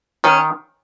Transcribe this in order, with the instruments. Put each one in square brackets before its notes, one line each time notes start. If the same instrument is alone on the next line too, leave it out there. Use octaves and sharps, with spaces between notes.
[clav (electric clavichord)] D#3 [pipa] C#4